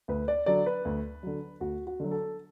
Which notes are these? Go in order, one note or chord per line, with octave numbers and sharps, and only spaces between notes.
D2 B4
D5
D3 F#3 D5
B4
D2
D3 F#3
D2 F#4
F#4
D3 F#3
A4